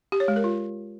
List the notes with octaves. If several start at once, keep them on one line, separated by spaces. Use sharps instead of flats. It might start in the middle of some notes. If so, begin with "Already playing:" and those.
G4
C#5
G#3
A#4
F4